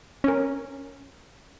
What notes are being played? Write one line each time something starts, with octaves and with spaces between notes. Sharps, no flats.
C#4 A#4